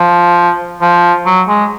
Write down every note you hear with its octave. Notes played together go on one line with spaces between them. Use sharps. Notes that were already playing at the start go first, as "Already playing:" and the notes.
Already playing: F3
F3
F#3
G#3